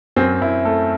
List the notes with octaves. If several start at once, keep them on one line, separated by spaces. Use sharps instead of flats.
F#2 C4
F#2 E4
A3 A4